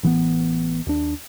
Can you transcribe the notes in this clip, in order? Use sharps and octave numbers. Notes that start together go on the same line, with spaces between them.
A1 E3 F3 B3
D#2 D4